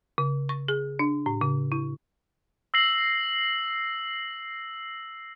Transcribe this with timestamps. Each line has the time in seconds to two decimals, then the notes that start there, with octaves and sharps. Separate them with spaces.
0.18 C#3
0.49 C#6
0.68 G#4
0.99 D4
1.26 A2
1.41 C#3
1.72 E4
2.74 E6 A#6 C7 F#7